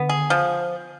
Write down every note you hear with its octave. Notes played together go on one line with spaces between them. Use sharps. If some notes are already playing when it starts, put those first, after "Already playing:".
Already playing: D3 B3
G#4
F3